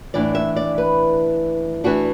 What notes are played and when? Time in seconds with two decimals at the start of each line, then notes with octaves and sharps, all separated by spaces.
0.14 A2 E3 D4 D5
0.35 E5
0.56 D5
0.78 B4
1.84 E3 A3 D4 F#4